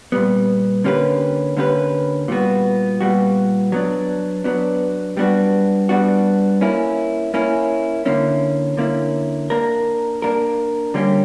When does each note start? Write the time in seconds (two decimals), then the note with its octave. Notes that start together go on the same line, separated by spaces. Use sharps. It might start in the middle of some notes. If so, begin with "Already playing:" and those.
0.12 A#2 G3 B3
0.84 D3 A#3 C#4 G4 B4
1.57 D3 A#3 C#4 G4 B4
2.28 A#2 G3 B3 F#4
3.01 A#2 G3 B3 F#4
3.72 F#3 B3 D4
4.44 F#3 B3 D4
5.17 G3 B3 D4 F#4
5.89 G3 B3 D4 F#4
6.61 A#3 C#4 E4
7.34 A#3 C#4 E4
8.05 D3 A#3 C#4 E4
8.77 D3 A#3 C#4 E4
9.50 A#3 D4 A#4
10.22 A#3 D4 A#4
10.94 D3 G3 A#3 C#4 G4